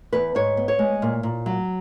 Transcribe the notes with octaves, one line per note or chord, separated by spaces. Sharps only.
E2 B4
G#2 C#5
B3
C#5
G#3
A#2
A#2
F#3